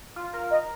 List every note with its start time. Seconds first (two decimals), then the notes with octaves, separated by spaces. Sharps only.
0.16 F4
0.34 A#4
0.51 D#5